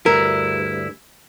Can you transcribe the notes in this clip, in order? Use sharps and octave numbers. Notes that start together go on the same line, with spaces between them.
D2 G2 E4 A#4